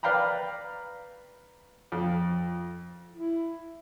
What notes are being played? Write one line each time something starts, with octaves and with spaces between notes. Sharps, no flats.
B4 D5 F5 G5 A#5 B5
F2
E4